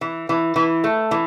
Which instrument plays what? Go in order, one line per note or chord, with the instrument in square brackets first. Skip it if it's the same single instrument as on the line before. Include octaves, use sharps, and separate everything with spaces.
[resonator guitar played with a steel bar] E3
E3
E3
A3
E3